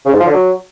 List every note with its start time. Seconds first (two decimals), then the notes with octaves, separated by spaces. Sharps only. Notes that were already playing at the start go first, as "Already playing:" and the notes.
0.05 C#3
0.13 G#2
0.20 F3
0.27 D3
0.34 F#3